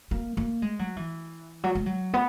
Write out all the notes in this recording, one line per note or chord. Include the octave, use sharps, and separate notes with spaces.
A#3
A#3
G#3
F#3
E3
F#3
G#3
F#3
B3